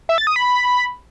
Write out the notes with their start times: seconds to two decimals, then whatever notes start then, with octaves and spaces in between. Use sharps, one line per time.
0.09 E5
0.18 A6
0.27 D#6
0.36 B5